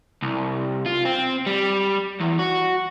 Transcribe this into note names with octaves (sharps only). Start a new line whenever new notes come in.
C2
F4
C4
G3
E2
F#4